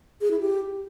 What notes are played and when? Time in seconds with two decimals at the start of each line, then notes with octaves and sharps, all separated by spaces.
0.21 G#4
0.31 E4
0.40 G4